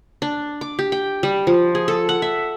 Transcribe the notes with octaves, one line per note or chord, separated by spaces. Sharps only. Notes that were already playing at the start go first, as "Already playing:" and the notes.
D4
D6
G4
G5
G3
F3
G#4
A4
F#5
E5